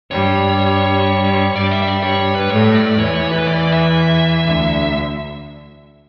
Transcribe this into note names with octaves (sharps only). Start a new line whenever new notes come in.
G2 G3 C#5
G2 G3 D5
E5
E5
D5
C#5
C#5
B4
A2 A3 C#5
D5
E2 E3 C#5
C#5
B4
D5
D5
E5
D2 D3